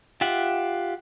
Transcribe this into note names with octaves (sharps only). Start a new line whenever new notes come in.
F4 G4 E5 F#5